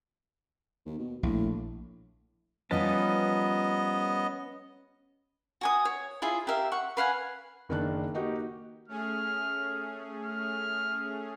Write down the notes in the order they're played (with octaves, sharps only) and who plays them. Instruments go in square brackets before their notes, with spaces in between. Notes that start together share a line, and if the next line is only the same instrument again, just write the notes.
[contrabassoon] D#2
B2
[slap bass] A#1 [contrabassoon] A2
[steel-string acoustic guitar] F3 G3 D#4 [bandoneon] B3 D#5 [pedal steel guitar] C#4 B4 A5
[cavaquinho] F#4 G#5 D#6
C#5
E4 F4 G#4 E5
G4 A#4 E5 F5
F#5 C#6
B4 F5 F#5 G#5
[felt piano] F#1 D#3 A#3 D4 A5 F#6
A#3 D#4 F#4 G4
[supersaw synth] A3 C#4 G#4 [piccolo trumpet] F6
[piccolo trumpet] F6